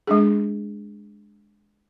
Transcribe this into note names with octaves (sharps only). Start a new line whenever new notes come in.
G#3 D4 G#4